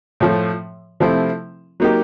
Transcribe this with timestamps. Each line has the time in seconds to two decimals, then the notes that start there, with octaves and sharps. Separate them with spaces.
0.20 A2 F3 A3
1.00 C3 F3 A3 C4 E4
1.80 F#3 A#3 D#4 G4